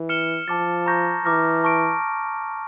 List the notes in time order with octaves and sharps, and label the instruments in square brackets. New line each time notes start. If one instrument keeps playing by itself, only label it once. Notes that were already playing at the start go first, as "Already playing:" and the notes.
Already playing: [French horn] E3
[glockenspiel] F6 C#7 E7 G7
[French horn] F3 [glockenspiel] A5 D6 A6
[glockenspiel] A#5 C#6 G6 A#6
[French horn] E3 [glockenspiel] A#5 D6 F6 A#6
[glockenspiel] A5 C#6 F6 A#6 D7